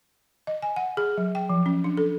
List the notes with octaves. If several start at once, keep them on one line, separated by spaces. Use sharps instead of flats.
D#5
G#5
F#5
G#4
F#3
G5
F3
C#4
D4
A4